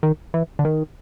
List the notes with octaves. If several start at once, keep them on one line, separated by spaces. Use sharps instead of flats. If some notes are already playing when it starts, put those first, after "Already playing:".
D#3
E3
D3
D#3